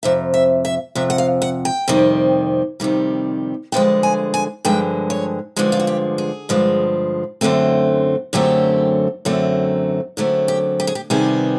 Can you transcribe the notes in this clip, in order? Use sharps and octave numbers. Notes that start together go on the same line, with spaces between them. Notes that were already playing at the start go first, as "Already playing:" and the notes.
F2 C3 E5
E5
E5
F2 C3 E5
F#5
F5
F#5
G5
F2 C3 D#3 G3
F2 C3 D#3 G3
G2 D3 F3 G#3 G5
G#5
G#5
G2 D3 F3 G#3 G5
C#5
G2 D3 F3 G#3
F4
F#4
G4
G#4
G2 D3 F3 G#3
F#2 D3 F#3 A3 C4
F#2 D3 F#3 A3 C4 G4
F#2 D3 F#3 A3 C4
F#2 D3 F#3 A3 C4
G4
G4
G#4
G4
C3 D#3 G3 B3 G#4